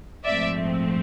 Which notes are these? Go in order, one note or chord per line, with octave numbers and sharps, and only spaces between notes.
A#1 G#2 F3 A3 C4 D5 E5